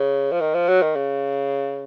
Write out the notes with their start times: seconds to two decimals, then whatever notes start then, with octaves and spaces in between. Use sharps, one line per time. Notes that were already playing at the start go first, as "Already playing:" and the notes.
Already playing: C#3
0.32 F3
0.41 D#3
0.54 F3
0.68 F#3
0.82 D#3
0.96 C#3